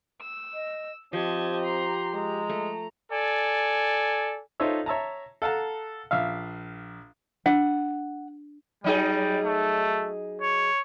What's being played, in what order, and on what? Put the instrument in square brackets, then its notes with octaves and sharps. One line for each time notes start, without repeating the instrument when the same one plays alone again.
[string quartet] E6
[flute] D#5
[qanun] F3 [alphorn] C4 [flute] G4 [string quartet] D#5 A5 G#6
[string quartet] A#5 C6
[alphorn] G#3 [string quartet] A#5
[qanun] A3
[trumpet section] A4 D5 G#5
[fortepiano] D#4 F4 A4 C5 C#5 E5
C#5 E5 A5 A#5
A4 F5 F#5 A5 A#5
A#1 E5 F5
[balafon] D4 [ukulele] F#5
[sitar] F#3 D#4 G#4 [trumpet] G3
[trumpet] A3
C#5